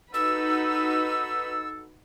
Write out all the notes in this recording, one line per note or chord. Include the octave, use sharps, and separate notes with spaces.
D#4 F#4 A4 B4 E6